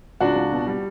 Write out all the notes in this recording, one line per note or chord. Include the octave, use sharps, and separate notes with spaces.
C#2 D4 F#4
C#2
B2
G3